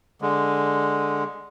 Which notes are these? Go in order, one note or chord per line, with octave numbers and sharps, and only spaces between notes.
D3 G#3